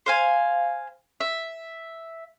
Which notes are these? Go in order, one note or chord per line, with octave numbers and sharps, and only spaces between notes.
C5 F5 G#5
E5